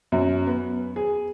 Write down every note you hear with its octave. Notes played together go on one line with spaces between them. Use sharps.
F#2
B3
G#4